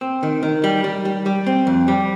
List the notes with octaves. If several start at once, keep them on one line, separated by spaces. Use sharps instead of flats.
C4
D#3
D#3
G3
G3
G3
G3
C4
F2
G3